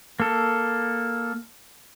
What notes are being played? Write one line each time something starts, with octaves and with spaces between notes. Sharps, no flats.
A#3 A4